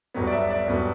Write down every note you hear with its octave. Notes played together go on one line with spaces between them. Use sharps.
G1 G2 F#3 B3
D5
E5
D5
G1 G2 F#3 B3